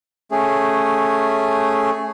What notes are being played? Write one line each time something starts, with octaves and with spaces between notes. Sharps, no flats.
A3 C#4 G#4